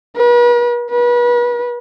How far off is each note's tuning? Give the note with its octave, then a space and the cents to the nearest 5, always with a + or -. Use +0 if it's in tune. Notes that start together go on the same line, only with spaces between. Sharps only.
B4 -45
B4 -35